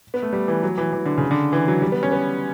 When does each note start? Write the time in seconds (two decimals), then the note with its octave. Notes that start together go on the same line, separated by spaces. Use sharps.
0.14 B3
0.23 A3
0.33 G3
0.48 E3
0.63 F#3
0.78 E3
0.93 E3
1.05 D3
1.17 C#3
1.31 D3
1.53 E3
1.68 F#3
1.82 G3
1.92 B3
2.03 C#4
2.12 B3